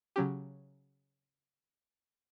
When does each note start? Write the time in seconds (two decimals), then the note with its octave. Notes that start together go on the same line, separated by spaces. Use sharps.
0.16 C#3 F#3 C#4 G4